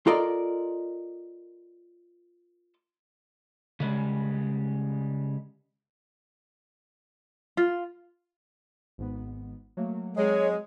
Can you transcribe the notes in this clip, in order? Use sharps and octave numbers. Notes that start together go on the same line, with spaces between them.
F4 A4 A#4 D5 D#5
C#3 G3 G#3
F4
G#1 G#2 B3
F#3 A3 A#3
F#3 G#3 C4 C#5